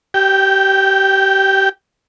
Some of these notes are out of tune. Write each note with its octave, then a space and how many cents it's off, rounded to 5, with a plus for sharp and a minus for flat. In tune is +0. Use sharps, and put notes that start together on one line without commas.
G4 -25 G5 +0